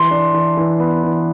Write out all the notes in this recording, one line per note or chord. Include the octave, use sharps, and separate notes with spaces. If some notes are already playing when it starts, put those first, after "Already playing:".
Already playing: E3 C6
D4
E3
E3
B3
E3